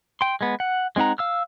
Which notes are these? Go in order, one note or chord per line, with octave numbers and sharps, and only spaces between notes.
G5 C6
G#3 B3
F#5
G#3 C4 D#4 F#5 A#5
F5 E6 F6